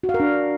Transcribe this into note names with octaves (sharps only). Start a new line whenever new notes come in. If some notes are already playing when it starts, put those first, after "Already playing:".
F#4
F5
A#4
D4